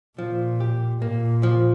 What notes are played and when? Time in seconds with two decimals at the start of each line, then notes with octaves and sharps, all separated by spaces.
0.18 A#2 F3
0.60 G4
1.02 A#2 A#3
1.43 F3